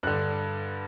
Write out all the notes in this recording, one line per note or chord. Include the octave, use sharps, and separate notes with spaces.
G2 D3 F#6